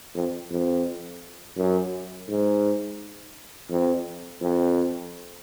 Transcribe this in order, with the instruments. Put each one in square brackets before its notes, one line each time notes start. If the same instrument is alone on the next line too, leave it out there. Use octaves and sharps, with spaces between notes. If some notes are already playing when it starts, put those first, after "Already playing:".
[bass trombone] F2
F2
F#2
G#2
F2
F2